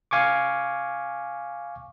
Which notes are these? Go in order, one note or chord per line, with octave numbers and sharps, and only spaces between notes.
F5 G#5 C#6 D6